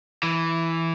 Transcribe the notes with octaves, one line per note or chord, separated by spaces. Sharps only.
E3